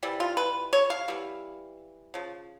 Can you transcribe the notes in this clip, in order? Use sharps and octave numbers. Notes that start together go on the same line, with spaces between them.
C3 E3 G3
F4
B4
C#5
F5
E3 G3 B3
C#3 F3